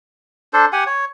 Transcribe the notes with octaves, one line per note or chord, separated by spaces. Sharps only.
D4 A4 C5
G4 F#5 G#5
C#5